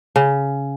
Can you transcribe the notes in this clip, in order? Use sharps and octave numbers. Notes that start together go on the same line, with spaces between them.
C#3